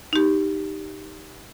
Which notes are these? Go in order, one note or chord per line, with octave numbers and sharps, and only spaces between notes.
D#4 G4